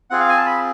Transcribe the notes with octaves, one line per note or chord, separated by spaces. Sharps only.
C4 F4 G#4 F#5
F5
G#5
A5
B5